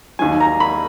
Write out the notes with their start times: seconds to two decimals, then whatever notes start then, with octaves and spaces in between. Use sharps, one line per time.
0.19 D#2 D#3 F#3 G#5
0.40 A#5
0.60 B5